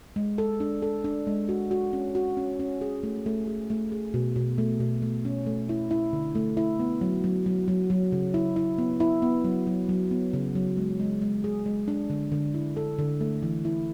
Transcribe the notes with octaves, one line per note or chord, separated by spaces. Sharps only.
G#3
A4
D4
A4
D4
G#3
F#4
F#4
C#4
F#4
C#4
C#4
G#4
A3
A3
G#4
A3
G#4
B2
B2
A3
B2
A3
C#4
A3
E4
E4
D3
A3
E4
B3
F#3
F#3
F#3
F#3
F#3
C#3
E4
E4
B3
E4
B3
F#3
F#3
F#3
B3
C#3
F#3
G#3
G#3
G#3
G#4
G#3
D4
D3
D3
E4
A4
D3
A3
E3
E4